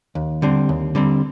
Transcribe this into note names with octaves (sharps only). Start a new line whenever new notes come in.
D#2
D3 G3 C4
D#2
D3 G3 C4